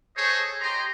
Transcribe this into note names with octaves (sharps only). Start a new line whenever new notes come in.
G#4 A4 C5 C#5 D#5
G4 D#5 A#5 C6